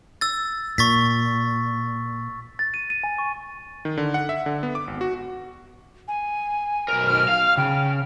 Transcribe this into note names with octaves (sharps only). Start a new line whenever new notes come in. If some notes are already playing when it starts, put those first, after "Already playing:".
E6 A6
A#2 C#6 A6 B6
A6
D#7
D#7
G#5
C#6
D#3
D3
F#5
E5
D3
B3
D6
G#1
F#4
G#5
B1 A#4
F6
F5
C#3 G5